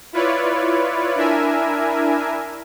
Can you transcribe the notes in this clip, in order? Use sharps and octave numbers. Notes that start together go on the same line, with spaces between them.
E4 F4 B4 C#5 D5
D4 E4 A#4 E5 G#5